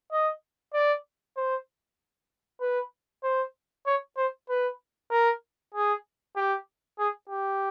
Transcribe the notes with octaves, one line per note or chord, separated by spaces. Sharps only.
D#5
D5
C5
B4
C5
C#5
C5
B4
A#4
G#4
G4
G#4
G4